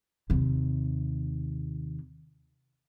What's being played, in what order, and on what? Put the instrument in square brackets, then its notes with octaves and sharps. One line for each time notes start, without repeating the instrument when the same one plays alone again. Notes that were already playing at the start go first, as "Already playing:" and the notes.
[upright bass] D#2 C3